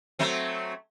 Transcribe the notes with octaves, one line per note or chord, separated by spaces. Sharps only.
F#3 A3 C4